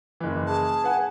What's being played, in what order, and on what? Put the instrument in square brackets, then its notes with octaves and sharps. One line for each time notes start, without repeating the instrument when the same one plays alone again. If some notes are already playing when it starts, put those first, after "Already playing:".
[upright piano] F#1 E3
[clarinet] G#4 [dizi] A5
[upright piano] B4 F#5 G#5